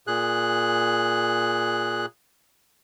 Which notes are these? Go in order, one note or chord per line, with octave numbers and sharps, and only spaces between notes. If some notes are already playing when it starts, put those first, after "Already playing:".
A#2 G#4 F#6